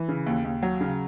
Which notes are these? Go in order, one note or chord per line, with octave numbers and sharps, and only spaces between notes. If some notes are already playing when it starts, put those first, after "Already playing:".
Already playing: E3
C#3
D#2
D#2
F#3
C#3